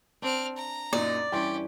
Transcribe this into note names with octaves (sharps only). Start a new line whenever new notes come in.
C4 D4 F6
A#5
F#2 A#2 D#4 D5
G2 E3 C#4 G4 G5 C6